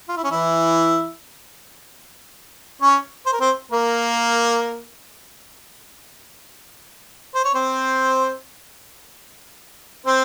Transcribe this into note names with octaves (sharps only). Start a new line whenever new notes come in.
F4
E4
C#4
E3 E4
C#4 C#5
C5
A#4
C4 C5
A#3 A#4
C5
C#5
C4 C5
C4 C5